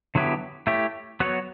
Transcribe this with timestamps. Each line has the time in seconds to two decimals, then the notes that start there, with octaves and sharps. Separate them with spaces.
0.15 D3 F#3 B3 E4 G4
0.67 A3 E4 G4 C#5
1.20 F#3 B3 F#4 C#5